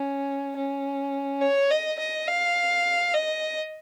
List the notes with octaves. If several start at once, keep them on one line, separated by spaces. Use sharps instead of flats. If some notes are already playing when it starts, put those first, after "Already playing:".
Already playing: C#4
C#4
C#5
D#5
D#5
F5
D#5